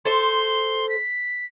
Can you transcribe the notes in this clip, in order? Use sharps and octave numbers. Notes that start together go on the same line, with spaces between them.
A4 C5 C6
B6